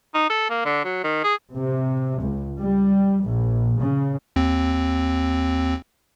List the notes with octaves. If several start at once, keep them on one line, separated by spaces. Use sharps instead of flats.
D#4
A4
A#3
D3
F#3
D#3
G#4
C3
C#2
G3
A#1
C#3
D#2 C4